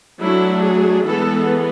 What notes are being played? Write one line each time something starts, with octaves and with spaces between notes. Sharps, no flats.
F#3 A3 D4 E4
G#4
E3 G#3 B3 A4